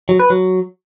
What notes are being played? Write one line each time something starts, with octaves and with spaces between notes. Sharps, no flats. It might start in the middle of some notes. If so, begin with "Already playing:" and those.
F#3
B4
F#3